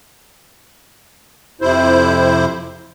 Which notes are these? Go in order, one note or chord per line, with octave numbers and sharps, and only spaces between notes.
F2 C3 E4 C5